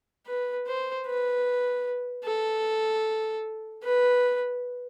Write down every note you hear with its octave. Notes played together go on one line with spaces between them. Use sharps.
B4
C5
B4
A4
B4